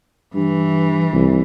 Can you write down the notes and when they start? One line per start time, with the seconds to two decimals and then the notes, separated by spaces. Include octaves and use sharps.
0.35 G2 E3
1.13 C2